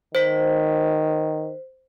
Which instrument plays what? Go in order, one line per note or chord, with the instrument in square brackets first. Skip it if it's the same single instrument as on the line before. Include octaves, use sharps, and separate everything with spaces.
[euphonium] D#3 [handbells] C5 B6